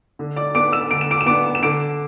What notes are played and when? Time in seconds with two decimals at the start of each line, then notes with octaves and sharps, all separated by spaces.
0.19 D3
0.36 D5 D6
0.55 B3 D4 D6 D7
0.72 E6 E7
0.91 D3 D7
1.01 E7
1.11 D6 D7
1.21 E7
1.26 B3 D4 D6 D7
1.55 E7
1.63 D3 D6 D7